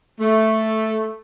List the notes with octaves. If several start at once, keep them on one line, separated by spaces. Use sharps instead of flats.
A3